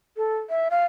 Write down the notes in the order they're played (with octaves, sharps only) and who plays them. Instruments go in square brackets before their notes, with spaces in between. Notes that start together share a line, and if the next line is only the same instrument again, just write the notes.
[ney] A4
E5
F5